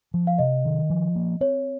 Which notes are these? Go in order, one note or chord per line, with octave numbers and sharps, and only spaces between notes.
F3
F5
C3 D#5
D#3
F3
A#3
C4 C#5